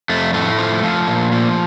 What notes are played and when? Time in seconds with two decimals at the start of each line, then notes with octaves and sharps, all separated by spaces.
0.09 F2 A3
0.34 A2 A3
0.58 F3
0.83 F3
1.08 A#2
1.32 F3